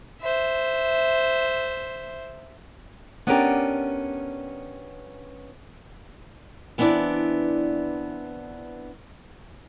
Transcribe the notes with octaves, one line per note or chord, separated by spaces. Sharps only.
C5 E5
B3 C#4 D4 G4 A#4 D5
E3 B3 C4 D4 E4 D5